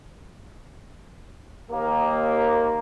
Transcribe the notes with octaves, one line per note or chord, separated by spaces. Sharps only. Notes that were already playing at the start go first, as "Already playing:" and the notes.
D#2 A#3